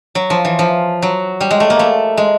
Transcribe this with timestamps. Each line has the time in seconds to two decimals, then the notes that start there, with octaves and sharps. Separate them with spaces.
0.15 F#3
0.30 F3
0.45 E3
0.59 F3
1.02 F#3
1.40 G3
1.51 G#3
1.60 A3
1.70 A#3
1.79 A3
2.17 G#3